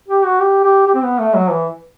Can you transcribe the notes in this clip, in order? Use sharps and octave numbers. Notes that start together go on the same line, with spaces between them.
G4
F#4
G4
G4
G4
C4
B3
A3
F#3
E3